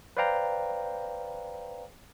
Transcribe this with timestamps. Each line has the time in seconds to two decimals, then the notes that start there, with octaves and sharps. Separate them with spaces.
0.17 B4 C5 D5 F5 G5 A#5